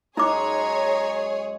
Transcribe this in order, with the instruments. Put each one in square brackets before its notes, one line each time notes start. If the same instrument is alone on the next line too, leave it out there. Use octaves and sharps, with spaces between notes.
[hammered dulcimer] F#2 G#3 [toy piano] D#4 D6 [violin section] G#4 C#5 [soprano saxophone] A#5